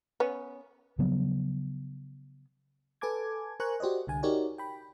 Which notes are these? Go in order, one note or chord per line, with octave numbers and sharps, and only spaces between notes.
B3 C#4
C#3 F3 F#3 B3
A4 B4 G#5 A5 D6 G#6
A#4 C5 G#5 A#5 C#6 F#6
F#4 G4 C5 D5 D#5
C2 D3 G#5
D#4 F#4 G4 A#4 C#5 D5
G5 B5